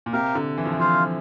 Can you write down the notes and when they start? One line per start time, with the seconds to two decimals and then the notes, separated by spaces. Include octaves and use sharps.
0.06 A#2
0.13 C3 G4 A#4 F5
0.35 D3
0.58 E3
0.65 F3
0.72 E3
0.80 F3 F4 C5 F5